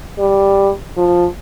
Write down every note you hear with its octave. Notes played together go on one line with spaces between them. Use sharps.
G3
F3